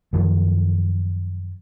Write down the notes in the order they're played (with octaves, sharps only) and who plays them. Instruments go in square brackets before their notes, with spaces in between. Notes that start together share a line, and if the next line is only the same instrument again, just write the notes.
[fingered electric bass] F#2 D#3 F3 F#3